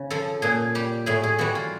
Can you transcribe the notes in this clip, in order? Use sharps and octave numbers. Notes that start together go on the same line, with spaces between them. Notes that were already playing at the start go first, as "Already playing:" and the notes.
Already playing: C#3
F3 A4
A#2 G#4
G3 G4
A2 G#4
G#4
E3 G3 F#4
F4